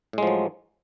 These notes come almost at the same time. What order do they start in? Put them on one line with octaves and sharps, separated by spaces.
A2 G#3 F3 F#3